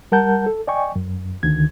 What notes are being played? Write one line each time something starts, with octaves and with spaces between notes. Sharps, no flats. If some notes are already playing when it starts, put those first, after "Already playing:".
G3 A#4 F#5 A5 G6
A4
D5 D#5 G5 G#5 C#6
F#2
D2 D3 D#3 G#6